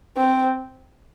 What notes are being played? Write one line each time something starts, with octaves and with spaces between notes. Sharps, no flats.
C4